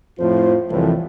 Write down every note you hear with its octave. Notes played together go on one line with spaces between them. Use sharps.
F2 A2 F3 F4 C5
C2 F2 A2 E3